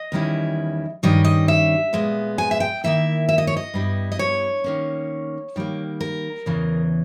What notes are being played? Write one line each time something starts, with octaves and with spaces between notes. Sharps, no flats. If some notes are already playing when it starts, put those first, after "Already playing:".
Already playing: D#5
E2 D#3 G3 C#4 E4
G2 D#3 G3 C#4 D#5
D#5
E5
A#2 G#3 B3
G#5
E5
G5
D#3 A#3 E4 E5
E5
D#5
C#5
D#5
G2 G3 B3 E4
D#5
C#5
D#3 A#3 C#4
D#3 G3 A#3
A#4
E2 C#3 E3